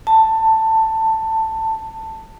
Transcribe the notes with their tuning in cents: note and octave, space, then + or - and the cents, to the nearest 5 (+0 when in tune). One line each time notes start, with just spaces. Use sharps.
A5 +15